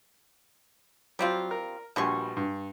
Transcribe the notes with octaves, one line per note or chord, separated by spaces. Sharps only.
F#3 G3 C4 F4
A#4
A#1 B2 G3 G#5 C6 C#6
G2